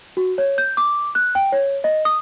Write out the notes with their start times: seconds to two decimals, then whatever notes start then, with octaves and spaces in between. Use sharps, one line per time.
0.17 F#4
0.38 C#5
0.58 G6
0.77 D6
1.15 F#6
1.35 G5
1.52 C#5
1.84 D#5
2.05 D#6